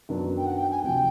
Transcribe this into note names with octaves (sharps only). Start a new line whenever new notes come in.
F#2 D#3 F#3 B3 D4
G5
F#5
G5
G#5
D2 C3 F3 G5